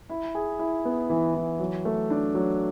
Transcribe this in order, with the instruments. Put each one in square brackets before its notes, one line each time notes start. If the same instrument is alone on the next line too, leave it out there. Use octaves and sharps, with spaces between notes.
[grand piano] E4
G#4
E4
B3
E3
E3
F#3
A3
D4
F#3